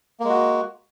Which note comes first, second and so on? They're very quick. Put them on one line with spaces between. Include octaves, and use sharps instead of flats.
A#3 G#3 F#4